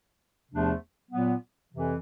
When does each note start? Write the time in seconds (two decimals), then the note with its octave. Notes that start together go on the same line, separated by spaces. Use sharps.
0.51 E2 C3 F3 A3 D4
1.11 A#2 F#3 B3
1.73 F2 C3 E3